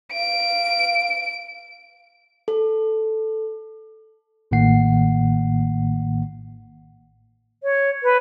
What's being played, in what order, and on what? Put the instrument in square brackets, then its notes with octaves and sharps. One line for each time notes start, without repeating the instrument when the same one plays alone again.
[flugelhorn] F5 [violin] D7
[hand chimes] A4
[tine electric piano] A1 A2 D#3 A#3 F#5 C7
[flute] C#5
B4